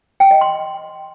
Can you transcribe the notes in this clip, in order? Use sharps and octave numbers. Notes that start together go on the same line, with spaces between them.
G5
D#5
C6